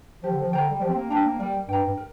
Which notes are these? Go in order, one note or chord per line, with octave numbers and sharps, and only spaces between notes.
F3 G4
D3
F3
D3 C5 G5 A#5
G3
F3 G4
C4
A#3
D4 C5 G5 A#5
A#3
G3 A#4
G2 G5 A#5
G2
A#4